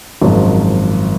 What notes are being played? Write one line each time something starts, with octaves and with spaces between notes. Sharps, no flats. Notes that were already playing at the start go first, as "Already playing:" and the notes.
G#1 F#2 F3 G#3